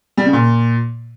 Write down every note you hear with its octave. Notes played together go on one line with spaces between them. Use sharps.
G3
C#3
A#2